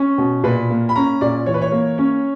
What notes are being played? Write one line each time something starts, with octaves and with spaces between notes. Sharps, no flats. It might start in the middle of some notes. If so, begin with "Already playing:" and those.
Already playing: C#4
B2
A#2 B4
A#3
B5
C#4 A#5
A#2 D5
E3 C#5
B4
C#5
A#3
C#4